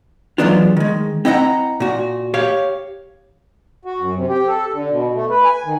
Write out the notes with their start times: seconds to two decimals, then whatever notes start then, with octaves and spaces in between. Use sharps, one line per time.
0.38 E3 F#3 G#3 B3 D4 F4
0.77 D#3 G#3
1.25 C4 E4 D#5 E5 F#5 A#5
1.80 A#2 F#4
2.34 G4 C#5 F5
3.85 F#4
4.00 F#2
4.16 C3
4.28 G4
4.48 A4
4.73 D3
4.90 B2
5.15 A3
5.30 B4
5.45 G#5
5.65 D#3